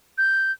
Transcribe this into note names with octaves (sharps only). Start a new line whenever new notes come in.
G6